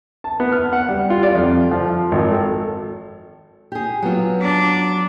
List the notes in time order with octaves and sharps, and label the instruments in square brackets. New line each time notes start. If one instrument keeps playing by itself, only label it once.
[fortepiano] A5
B3
F6
F#5
G3
F4
D5
F2
F3
G#1
A4
[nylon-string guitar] G4 G#4
F#3 B3 F4
[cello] D4